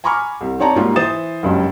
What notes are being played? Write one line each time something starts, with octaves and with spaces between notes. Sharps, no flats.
G#5 A#5 B5 C#6 D6 F6
C2
C4 D#4 C#5 D5 A5 A#5
G#2 G3 A#3 F4 F#4
E3 C5 D#6 A6 E7
F#1 C#2 G2 F#3